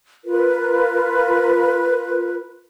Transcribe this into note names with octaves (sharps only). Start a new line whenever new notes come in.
F4 A#4 B4